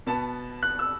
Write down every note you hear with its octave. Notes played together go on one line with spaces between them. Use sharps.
B2 B3 A5
F#6
E6